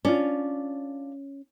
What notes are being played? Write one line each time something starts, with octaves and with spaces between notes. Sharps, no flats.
C#4 D4 F4